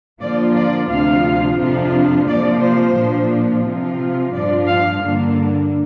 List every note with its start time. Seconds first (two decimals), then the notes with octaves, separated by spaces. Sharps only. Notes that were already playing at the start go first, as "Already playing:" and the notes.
0.21 D3 F3 A#3 F4 D5
0.56 D5
0.89 D2 C3 F3 D4 F4 F5
1.59 F2 C3 F3 D4 F4
2.27 C3 F3 A#3 F4 D5
2.61 C5
2.96 A#2 F3 D4
3.64 C3 F3 C4 F4
4.33 G2 F3 D4 F4 D5
4.68 F5
5.02 G2 D3 A#3 D4